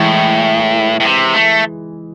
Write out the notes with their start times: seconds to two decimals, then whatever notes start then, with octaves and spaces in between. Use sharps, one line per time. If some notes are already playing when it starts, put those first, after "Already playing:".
Already playing: A2 E3 G#3
1.00 A2
1.05 C3
1.34 A3